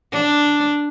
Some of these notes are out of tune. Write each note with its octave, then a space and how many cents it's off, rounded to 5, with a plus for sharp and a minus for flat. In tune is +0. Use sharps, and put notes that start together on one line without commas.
D4 +0